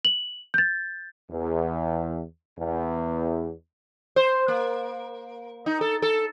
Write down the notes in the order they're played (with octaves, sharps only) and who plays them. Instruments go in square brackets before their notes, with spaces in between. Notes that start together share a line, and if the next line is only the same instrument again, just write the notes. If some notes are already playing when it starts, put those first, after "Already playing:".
[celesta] F#7
G6 A6
[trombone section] E2
E2
[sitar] C5
A#3
D#4
A4
A4